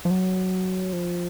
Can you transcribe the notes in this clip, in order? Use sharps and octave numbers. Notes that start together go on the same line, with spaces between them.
F3
F#3
F3